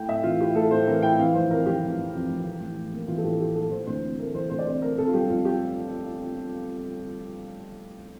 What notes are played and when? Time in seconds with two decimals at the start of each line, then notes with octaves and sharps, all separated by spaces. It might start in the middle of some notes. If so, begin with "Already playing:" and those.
Already playing: A3 E4 G5
0.08 A2 E5
0.23 E3 F4
0.40 E4 G4
0.55 A3 A4
0.71 A2 C5
0.87 E3 A#4
1.02 E4 G5
1.19 E3 F5
1.34 F1 C5
1.50 F2 A#4
1.66 F1 G4
1.82 E3
1.98 F1
2.14 F2
2.30 F1
2.45 E3
2.61 A1
2.77 A2
2.92 A#3
3.08 E3 F4
3.18 A4
3.24 A1 G4
3.32 A4
3.40 A2 G4
3.55 A#3 A4
3.71 E3 C5
3.87 D2 C5
4.04 C3
4.19 A3 A#4
4.34 E3 C5
4.50 D2 C5
4.59 D5
4.66 C3 C5
4.82 A3 A#4
4.98 C3 A4
5.07 F4
5.14 G1 G4
5.29 F2 F4
5.45 G4